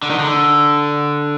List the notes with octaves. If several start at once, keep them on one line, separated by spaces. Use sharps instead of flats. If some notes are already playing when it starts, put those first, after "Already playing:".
D3
D#3
D3